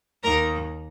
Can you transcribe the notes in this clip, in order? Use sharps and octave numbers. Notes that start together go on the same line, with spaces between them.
D#2 A#4 A#5